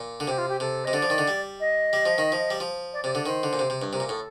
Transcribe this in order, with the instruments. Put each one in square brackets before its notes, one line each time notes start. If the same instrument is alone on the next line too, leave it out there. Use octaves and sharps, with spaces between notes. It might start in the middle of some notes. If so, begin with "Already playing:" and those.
Already playing: [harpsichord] A#2
D3
[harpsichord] C3 [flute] G4
[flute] F4
G4
[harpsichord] C3 [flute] A4
[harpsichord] C3 [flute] D#5
[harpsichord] D3 [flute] D5
[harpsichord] F3
D#3
D3
G3
[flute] D#5
[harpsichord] G3
F3
D#3
F3
G3
F3
[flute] D5
[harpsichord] C3 [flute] D5
[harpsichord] D3 [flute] D5
[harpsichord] D#3 [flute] C5
[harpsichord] D3
A#2
C3
C3
G2
[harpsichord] C3 [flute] A#4
[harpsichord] A#2
[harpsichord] A2 [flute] A4